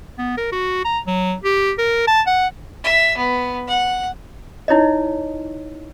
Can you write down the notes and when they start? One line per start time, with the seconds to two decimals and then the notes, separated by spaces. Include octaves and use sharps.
0.18 B3
0.37 A#4
0.52 F#4
0.85 A#5
1.07 F#3
1.44 G4
1.78 A#4
2.07 A5
2.27 F#5
2.84 E5
3.17 B3
3.68 F#5
4.68 D#4 E4 C#5 D#5